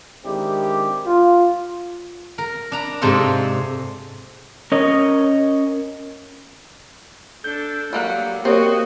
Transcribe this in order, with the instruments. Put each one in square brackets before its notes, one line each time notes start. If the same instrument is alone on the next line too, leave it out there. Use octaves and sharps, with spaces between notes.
[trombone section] D#3 G#3 C4 D4 E4 G4
F4
[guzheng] A#4
D4 A#5 B5
G#2 C3 A4 C5 F5
[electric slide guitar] C#4 A#4 C#5 D#5
[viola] D4 A4 [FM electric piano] G6
[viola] F#3 [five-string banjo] G3 A#3 F#5
[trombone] A#3 [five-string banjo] C4 [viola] F#4 D#5 [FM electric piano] G4 C#5